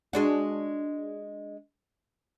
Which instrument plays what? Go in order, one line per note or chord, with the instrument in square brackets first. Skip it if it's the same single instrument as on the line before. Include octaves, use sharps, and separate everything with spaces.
[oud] G#3 D4 F#4